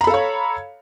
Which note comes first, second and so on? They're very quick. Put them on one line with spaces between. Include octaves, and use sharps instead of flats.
A#5 B5 A4 F5 C#5